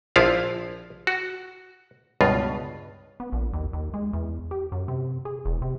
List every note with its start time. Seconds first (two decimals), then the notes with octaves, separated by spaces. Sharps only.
0.16 A#1 F3 E4 F4 F5
1.07 F#4
2.21 C#2 G2 B2 F4
3.20 B3
3.32 A#1
3.53 D#2
3.73 D#2
3.94 G#3
4.13 E2
4.51 G4
4.72 F#2
4.88 C3
5.25 G#4
5.45 E1
5.62 C3